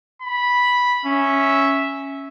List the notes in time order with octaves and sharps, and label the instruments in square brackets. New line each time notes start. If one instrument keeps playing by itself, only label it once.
[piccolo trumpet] B5
[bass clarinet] C#4 [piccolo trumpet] E5